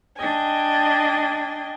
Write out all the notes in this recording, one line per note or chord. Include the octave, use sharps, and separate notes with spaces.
D4 D#5 G5 G#5